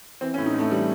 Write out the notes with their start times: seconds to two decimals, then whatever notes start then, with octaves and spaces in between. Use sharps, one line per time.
0.21 E3 C4
0.34 C#4
0.38 A2
0.46 D#4
0.54 A2 A3
0.71 E3 G3